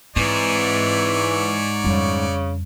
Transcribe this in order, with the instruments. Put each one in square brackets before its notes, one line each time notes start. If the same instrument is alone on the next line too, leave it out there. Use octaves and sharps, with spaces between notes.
[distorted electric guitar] G#2 [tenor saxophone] E3 [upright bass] C4 [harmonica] C#5 D5
[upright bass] F2 G3 [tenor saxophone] C#3